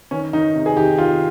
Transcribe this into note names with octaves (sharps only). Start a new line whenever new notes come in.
D#3 C#4
D#3 D#4
C3
G#4
D#3 G4
D#3 F4